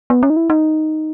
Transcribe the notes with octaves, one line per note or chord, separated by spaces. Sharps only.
B3
C#4
D#4
E4
D#4